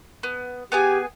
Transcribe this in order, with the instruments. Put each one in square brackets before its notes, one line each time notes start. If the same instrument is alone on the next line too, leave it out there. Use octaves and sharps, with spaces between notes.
[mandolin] B3
[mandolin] B3 G#4 G#5 [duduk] G4